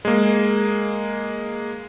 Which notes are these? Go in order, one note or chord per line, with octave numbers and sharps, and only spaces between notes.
G#3 A#3